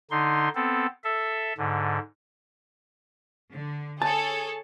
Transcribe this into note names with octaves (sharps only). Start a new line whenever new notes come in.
D3 D#4 C6
B3 C4 A4
A4 E5
G#2 D3
D3
G#4 A4 C#5 A5